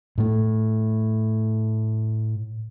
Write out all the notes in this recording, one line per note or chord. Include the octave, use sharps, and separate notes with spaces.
A2 A3